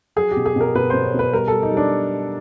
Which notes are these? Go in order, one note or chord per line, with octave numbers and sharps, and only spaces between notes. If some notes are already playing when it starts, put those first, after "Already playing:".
F#3 G#4
G4
B2
G#4
B2 A#4
B2 B4
B2 C5
C#5
B2 B4
G3 A#4
G3 A4
D#4
G3
D4